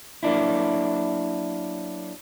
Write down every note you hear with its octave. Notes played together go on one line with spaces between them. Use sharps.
F#3 A#3 D4 E4